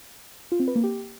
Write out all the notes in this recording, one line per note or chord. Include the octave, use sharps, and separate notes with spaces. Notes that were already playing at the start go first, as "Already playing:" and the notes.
F4
C4
B4
A#3
G4